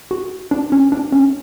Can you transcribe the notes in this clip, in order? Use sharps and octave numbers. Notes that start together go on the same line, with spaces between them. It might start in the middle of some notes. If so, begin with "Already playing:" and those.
F#4
D4
C#4
D4
C#4